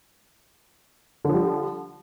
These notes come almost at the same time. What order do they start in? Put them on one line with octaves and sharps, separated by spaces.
D3 F3 G3